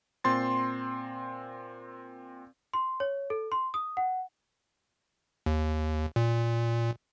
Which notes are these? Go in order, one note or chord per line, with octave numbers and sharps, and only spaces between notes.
A#2 C4 C6 A6
C6
C#5
A4
C6
D#6
F#5
D#2
A#2